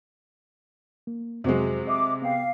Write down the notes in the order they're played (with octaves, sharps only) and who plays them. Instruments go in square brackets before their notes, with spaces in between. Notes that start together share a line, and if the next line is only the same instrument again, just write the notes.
[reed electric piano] A#3
[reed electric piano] F2 F#4 C5 [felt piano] C3 F#3 G#3
[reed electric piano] D#5 E5 D#6 [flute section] D6
[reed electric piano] B3 G5 [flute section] F5